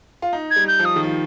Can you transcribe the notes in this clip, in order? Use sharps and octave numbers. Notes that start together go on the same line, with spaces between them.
F4
D#4
G#6
G3
G6
F3
D#6
D#3
F3